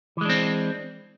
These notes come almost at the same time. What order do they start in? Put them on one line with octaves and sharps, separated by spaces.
E3 G#3 D4 C4